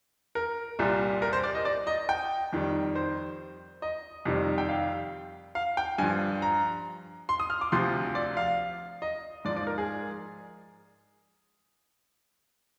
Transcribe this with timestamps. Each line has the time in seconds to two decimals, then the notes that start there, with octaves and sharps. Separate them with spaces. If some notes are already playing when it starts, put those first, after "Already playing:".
0.35 A#4
0.79 C2 A#2 G3
1.22 A#4
1.33 C5
1.44 D5
1.55 D#5
1.65 D5
1.87 D#5
2.09 G5
2.53 F2 D#3 G3
2.95 C5
3.82 D#5
4.25 F2 C3 D#3 G3
4.58 G5
4.69 F5
5.55 F5
5.77 G5
5.98 G2 F3 G#5
6.42 A#5
7.29 C6
7.40 D#6
7.50 F6
7.61 D6
7.72 D2 C3 F3 C6
8.15 D5
8.37 F5
9.02 D#5
9.45 G#2 F3 D5
9.57 D5
9.67 A#4
9.78 G#4